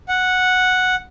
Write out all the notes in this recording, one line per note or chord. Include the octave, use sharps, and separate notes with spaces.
F#5